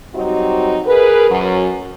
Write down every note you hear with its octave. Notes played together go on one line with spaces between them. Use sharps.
F#3 G3 C4 D#4 F#4
G#4 A#4 B4
F#2 F#3